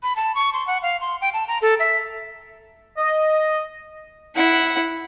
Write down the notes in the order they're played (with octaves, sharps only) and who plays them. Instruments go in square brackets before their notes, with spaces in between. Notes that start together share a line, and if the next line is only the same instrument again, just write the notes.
[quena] B5
A5
C#6
C6
F#5
F5
C6
G5
A5
A#5
A4
E5
[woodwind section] D#5
[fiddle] E4 F#5